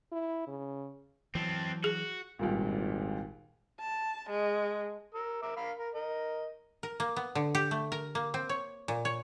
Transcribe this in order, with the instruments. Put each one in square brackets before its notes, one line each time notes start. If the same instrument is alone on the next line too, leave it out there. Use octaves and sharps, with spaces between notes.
[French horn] E4
C#3
[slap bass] E3 F#3 [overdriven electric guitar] C4 A4
[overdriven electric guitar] F#4 [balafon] G#4
[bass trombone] G#1 [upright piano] C#2 G2 A#2
[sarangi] A5
G#3
[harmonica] A#4 E6
A#4 E5 D6
A#4 F5 B5
A#4
A#4 D#5
[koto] A#4
A#3
B3
D3
G4
A3
A#4
A#3
C4
C#5
A#2
C#5